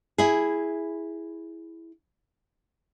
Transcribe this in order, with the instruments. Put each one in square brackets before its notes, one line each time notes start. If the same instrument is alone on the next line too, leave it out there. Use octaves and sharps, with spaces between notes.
[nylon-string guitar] E4 G#4